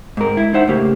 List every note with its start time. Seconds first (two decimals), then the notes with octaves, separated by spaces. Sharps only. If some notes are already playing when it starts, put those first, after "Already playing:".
0.17 G#2 A#4
0.37 E4
0.54 D#4 C5 E5 F#5
0.68 A2 C#3 A#3 G4